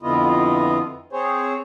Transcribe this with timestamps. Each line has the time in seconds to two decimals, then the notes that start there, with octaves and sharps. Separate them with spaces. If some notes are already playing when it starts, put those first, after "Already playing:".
0.02 F2 D3 B3 E4 F4 D#5
1.13 C4 G#4 C5 C#5